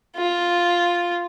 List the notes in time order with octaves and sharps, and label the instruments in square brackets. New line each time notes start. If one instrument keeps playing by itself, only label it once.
[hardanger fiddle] F4